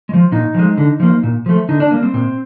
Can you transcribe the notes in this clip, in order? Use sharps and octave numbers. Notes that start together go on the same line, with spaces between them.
G#3
F3
A#2 D#4
F3 G#3
D3
F3 A#3
A#2
F3 A3
D3 D#4
D4
G3 A#3
C4
A#2 C4